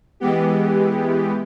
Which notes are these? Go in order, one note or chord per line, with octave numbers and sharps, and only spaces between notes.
E3 G#3 B3 G4